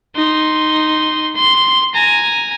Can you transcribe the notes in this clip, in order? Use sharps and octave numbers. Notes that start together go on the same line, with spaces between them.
D#4 C6
C6
G#5 A#5